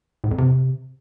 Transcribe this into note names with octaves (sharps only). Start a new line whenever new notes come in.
A2
F2
C3